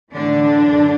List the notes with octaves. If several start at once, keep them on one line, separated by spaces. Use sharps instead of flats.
A2 D3 E3 D4
F#2 D3